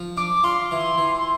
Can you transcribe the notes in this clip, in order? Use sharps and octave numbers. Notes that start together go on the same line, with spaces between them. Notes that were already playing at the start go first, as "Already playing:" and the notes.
Already playing: F3
D4 D6
F4 C6
E3
E3